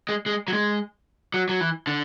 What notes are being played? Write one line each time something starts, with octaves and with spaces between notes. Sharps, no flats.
G#3
G#3
F#3
G#3
F#3
F#3
E3
D3